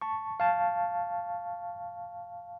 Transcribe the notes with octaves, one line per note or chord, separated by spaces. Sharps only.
A5 C#6
F5 A5